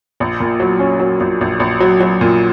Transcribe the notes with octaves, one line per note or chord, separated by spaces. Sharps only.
A#1
A#2
F#3
C#4
F#3
A#1
A#1
A#1
F#3
F#3
A#2